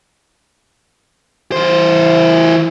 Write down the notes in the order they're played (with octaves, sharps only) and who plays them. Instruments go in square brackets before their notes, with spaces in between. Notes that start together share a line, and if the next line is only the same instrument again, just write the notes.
[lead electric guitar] E3 C5